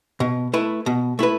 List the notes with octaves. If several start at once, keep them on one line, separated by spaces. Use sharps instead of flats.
B2
A3 E4 B4
B2
A3 E4 B4